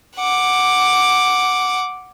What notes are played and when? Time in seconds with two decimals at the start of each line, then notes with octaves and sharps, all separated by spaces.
0.17 F#5 D6